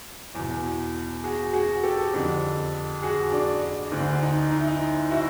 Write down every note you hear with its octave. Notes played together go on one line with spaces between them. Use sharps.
E2 B2
F#4 G#4
F#4 G#4
G4 A4
F2 D3
F#4 G#4
D4
D2 D3
D#4
D#4
E4
D#4
E4 F#4